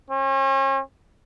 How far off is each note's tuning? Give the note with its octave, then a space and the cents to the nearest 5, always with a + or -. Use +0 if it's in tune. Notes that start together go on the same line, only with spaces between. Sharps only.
C#4 -40